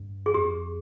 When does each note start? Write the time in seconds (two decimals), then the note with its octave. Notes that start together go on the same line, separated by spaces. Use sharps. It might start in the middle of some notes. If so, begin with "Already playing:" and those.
Already playing: G2
0.26 G#4
0.34 F2 G4